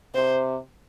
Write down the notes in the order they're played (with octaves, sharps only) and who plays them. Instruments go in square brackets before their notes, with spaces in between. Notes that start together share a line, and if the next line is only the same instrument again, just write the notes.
[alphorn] C3 [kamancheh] C5